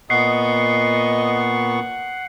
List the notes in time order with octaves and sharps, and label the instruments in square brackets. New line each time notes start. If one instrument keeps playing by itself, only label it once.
[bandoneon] A#2 B3 C#6 [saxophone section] D#5 [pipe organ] F#5 [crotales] C7